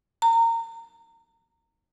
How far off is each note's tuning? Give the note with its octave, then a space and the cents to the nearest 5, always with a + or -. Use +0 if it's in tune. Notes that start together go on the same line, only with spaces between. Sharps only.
A#5 -25